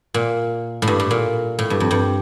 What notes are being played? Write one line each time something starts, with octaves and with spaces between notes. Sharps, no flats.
A#2
A2
G2
A2
A#2
A2
G2
F2
G2